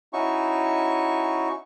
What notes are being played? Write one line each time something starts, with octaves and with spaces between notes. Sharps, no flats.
C#4 D#4 E4 F#4 C#6